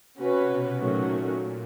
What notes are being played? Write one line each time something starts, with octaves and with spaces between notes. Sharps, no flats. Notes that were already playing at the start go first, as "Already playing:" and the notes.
C3 C#4 F#4 B4
B2
A#2 D#3 F#3 A3 C#4 F#4